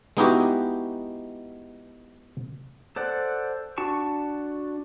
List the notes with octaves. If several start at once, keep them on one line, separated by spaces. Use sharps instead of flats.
G#3 B3 D#4 E4 F#4 G4
A4 C5 D5 F#5
D4 F#4 A5 C#6